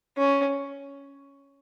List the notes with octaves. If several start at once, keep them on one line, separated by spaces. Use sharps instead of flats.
C#4